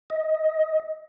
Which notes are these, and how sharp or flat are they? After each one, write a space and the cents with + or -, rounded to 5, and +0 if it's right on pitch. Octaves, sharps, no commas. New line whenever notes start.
D#5 +20